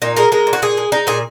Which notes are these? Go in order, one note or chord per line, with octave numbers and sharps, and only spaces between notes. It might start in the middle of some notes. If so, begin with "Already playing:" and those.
A#2 D#4
G#3 A#4
G#3 A#4
A#2
F#4
A#2 G#4
G#3
G#3 D#4
A#2 G#4